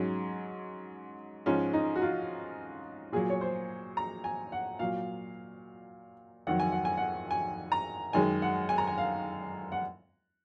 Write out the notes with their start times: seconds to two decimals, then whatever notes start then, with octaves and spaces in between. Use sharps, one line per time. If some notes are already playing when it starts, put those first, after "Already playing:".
Already playing: G#2 F#3 C#4
1.46 G#2 F3 G#3 C#4
1.73 D#4
1.96 F#4
2.02 F4
3.12 A#2 F#3 G#4
3.30 C#5
3.41 C5
3.97 A#5
4.24 G#5
4.52 F#5
4.79 A#2 F#3 F5
6.47 F2 D#3 F#3 F#5
6.60 G#5
6.72 F#5
6.85 G#5
6.97 F#5
7.31 G#5
7.72 A#5
8.13 F#2 D#3 G#3 G#5
8.42 F#5
8.69 G#5
8.78 A#5
8.87 G#5
8.98 F5
9.72 F#5